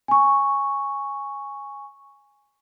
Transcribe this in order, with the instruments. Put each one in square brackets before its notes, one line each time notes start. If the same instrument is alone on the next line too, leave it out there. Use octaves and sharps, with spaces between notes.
[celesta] G#5 C#6